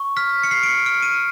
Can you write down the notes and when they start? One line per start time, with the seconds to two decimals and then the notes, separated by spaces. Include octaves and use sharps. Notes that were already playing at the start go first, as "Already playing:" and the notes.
Already playing: C#6
0.17 F6 B6
0.43 C#7
0.51 F6 C7
0.63 D7
0.69 C#7
0.86 F6 D7
1.03 D#7